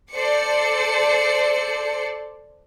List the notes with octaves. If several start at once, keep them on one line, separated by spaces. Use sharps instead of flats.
A4 C5 D5 C#7